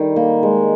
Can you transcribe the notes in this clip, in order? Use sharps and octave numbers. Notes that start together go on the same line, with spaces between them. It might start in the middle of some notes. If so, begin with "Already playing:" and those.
Already playing: D#3 G3
A#3
G#3